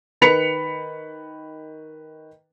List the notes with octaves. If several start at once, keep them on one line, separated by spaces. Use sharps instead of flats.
D#3 B4 B5 B6 C#7 F7